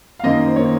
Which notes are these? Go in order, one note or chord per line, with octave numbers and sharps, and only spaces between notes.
F5
F#2 D#3 A#3 D#5
C5
D#3 A#3 C#5